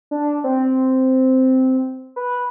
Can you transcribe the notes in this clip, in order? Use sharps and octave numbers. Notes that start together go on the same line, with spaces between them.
D4
C4
B4